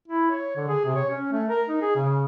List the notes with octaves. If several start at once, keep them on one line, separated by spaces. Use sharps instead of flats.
E4
C#5
D3
G#4
C3
C#5
C#4
A3
A#4
D#4
G#4
C#3